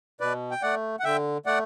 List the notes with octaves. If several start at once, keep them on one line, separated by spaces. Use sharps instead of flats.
B2 B4 D5
G5
A3 D5 F#5
F#5
D3 E5 G5
A3 D5 F#5